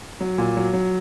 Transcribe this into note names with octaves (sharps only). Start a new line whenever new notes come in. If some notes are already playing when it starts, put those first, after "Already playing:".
F#3
A#2
F#3
F#3